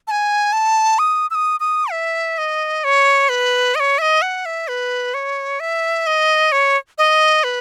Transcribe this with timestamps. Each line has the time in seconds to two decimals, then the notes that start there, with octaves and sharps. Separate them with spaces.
0.07 A5
0.11 G#5
0.53 A5
0.99 D#6
1.31 E6
1.35 D#6
1.60 D#6
1.91 E5
2.38 D#5
2.84 C#5
3.29 B4
3.75 D#5
3.80 C#5
3.98 E5
4.02 D#5
4.22 F#5
4.45 E5
4.68 B4
5.14 C#5
5.60 E5
6.07 D#5
6.52 C#5
6.98 D#5
7.44 B4